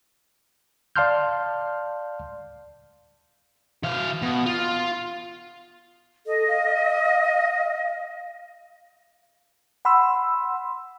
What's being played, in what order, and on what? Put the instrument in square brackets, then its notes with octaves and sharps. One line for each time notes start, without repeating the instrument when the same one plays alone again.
[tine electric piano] D5 F5 A5 C6 F6 G6
[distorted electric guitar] E3 F5
B2
F4
[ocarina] A4 [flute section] D#5
[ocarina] F5
[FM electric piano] F#5 B5 C6 E6